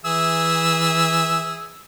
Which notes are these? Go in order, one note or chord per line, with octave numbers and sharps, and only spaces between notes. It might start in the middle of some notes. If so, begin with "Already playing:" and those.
E3 G#4 E5 E6